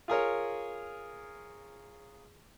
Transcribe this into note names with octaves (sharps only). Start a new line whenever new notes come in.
F4 G#4 A#4 C#5